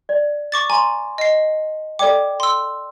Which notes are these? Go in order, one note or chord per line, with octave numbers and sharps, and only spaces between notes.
D5
C#6 D6 A6
G#5 A#5 C6
D#5 C7
A4 D5 G5 D6
C6 E6